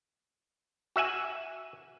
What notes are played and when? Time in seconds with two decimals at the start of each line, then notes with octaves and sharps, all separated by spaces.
0.96 F#4 E5 F#5 G#5